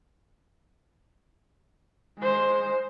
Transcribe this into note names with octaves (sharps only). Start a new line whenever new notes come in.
G#3 C5